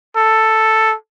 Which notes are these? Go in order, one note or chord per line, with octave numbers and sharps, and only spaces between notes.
A4